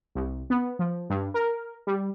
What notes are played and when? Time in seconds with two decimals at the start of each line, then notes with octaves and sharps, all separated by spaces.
0.15 C2
0.50 B3
0.79 F3
1.10 G2
1.34 A#4
1.87 G3